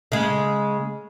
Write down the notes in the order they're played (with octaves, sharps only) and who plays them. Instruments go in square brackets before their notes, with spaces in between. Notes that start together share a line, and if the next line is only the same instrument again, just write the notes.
[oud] C#3 G#3